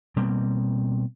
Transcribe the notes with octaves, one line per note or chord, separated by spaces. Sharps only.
B2 G3 A#3 C4